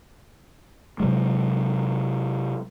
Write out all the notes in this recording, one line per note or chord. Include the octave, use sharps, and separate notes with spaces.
C3 F#3 G#3